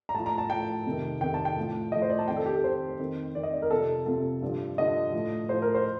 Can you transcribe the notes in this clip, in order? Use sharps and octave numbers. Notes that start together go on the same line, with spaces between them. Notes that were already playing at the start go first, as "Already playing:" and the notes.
A#5
A2 F3 A5
A#5
A5
A2 F3 G5
F2 C3 D#3
F2 C3 D#3 G5
A5
G5
A2 F3
A2 F3 D#5
C5
D5
A5
F2 D#3 G5
A4
G4
A4
F2 D#3 C5
F2 D#3
F2 D#3 D5
D#5
D5
A#4
F2 C3 F3 A4
F2 C3 F3 A4
G2 D3 F3
G2 D3 F3 D#5
A2 F3
A2 F3 C5
A#4
C5